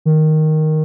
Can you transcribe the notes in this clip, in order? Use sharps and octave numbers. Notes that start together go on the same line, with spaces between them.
D#3